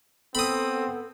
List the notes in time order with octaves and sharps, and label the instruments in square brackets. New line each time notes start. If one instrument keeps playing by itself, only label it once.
[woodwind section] B3 [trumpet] C4 [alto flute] A4 [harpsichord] B5 D#6